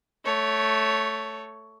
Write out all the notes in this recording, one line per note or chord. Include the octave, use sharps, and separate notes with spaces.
A3 C#5